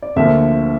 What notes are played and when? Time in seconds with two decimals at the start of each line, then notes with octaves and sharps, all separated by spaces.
0.02 D5
0.16 D2 D3 F3 A#3 E5